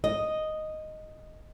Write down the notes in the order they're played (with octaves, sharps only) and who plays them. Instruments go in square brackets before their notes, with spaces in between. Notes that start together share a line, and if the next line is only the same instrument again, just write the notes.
[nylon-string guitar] D#5